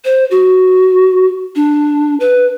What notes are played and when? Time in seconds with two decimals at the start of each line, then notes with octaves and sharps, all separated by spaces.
0.05 C5
0.31 F#4
1.56 D4
2.20 B4